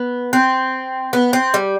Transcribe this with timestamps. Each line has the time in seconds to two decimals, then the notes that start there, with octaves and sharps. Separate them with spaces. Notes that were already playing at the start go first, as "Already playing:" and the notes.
Already playing: B3
0.33 C4
1.13 B3
1.33 C4
1.54 G3